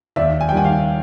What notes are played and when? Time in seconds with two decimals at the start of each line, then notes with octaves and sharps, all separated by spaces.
0.16 D#2 D5 E5
0.41 G#5
0.49 G5
0.52 D#3 G3 F#5 G#5
0.64 F5 G5